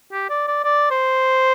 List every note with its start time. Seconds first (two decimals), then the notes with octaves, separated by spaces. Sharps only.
0.13 G4
0.30 D5
0.48 D5
0.64 D5
0.91 C5